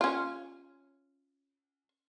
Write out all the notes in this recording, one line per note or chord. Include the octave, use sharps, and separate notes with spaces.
C#4 F4